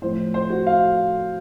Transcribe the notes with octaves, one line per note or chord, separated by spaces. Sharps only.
A2 F3 C4 C5
C5
F#4
F5